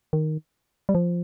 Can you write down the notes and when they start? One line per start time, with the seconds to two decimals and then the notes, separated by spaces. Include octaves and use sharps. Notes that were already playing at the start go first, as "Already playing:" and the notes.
0.13 D#3
0.89 G3
0.95 F3